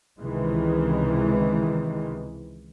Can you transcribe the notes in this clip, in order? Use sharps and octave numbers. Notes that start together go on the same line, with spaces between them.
C#2 C3 D#3 E3 G#3